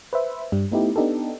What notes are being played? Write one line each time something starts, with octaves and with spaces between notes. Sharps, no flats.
B4 C5 E5
G2 G3
A3 B3 D#4 E4 G4
B3 D4 D#4 G4 A4